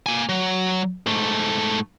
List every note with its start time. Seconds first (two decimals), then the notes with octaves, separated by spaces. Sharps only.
0.06 A#3 G#5
0.29 F#3
1.06 G#2 A3